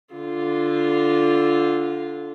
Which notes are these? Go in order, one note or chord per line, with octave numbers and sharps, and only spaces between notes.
D3 F4